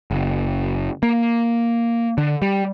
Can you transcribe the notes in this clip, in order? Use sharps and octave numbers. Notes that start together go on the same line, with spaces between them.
F#1
A#3
D3
G3